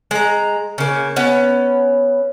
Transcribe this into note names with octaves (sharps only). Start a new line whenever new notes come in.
G#3 A#5
C#3 A#3
B3 C#4